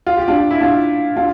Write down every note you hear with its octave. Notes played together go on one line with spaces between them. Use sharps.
F4
G4
D4 F4
E4
D4 F4
D4 F4